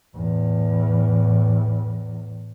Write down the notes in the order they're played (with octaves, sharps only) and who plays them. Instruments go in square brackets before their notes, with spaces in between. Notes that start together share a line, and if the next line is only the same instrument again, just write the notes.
[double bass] E2 A2